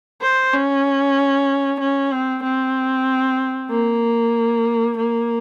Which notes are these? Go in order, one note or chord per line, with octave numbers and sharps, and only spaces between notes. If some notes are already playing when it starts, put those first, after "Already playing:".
C5
C#4
C#4
C4
C4
A#3
A#3